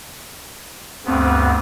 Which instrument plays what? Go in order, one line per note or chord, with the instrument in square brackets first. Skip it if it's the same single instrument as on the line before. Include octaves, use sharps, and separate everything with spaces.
[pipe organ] D2 G2 B3 [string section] C4